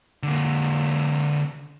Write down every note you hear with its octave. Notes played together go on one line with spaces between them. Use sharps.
D3 A#3